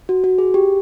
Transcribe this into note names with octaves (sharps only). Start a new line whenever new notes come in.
F#4
F#4
G#4
G4